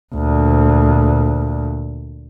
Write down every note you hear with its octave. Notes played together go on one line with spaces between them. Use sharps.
D2 A#2